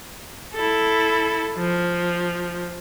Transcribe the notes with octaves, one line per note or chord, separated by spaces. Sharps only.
E4 A4
F3